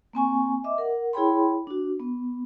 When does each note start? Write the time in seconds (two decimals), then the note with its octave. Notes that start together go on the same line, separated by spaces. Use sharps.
0.13 A#3 C4 G#5 C#6
0.64 D#5 E5 D6
0.78 A#4 F#5
1.13 E4 G#4 C#5 G5 B5 C6
1.67 D4 F#4
2.00 B3